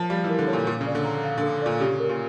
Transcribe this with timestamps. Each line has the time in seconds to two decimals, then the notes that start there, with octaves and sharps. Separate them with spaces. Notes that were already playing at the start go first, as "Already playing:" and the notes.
Already playing: F3 A#4 C#5 A5
0.10 G3 F5
0.24 E3
0.29 A#4
0.38 D3
0.48 C#5
0.53 A#2
0.67 A#2 A4
0.81 C#3
0.86 D5
0.95 D3
1.05 A#5
1.24 F5
1.38 D3
1.43 A4
1.62 A#2 D5
1.80 C#3 G4
2.00 A#4
2.09 A#2